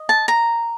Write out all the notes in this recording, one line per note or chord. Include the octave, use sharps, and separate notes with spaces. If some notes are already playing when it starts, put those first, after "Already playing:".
Already playing: D#5
A5
A#5